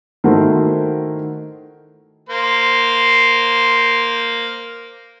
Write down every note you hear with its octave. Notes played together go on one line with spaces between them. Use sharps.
D#3 A3 E4 F#4 A#4 C5
A#3 C5